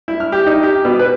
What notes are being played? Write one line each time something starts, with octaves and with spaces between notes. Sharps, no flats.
E4
F6
G4
D#4
G4
B2
B4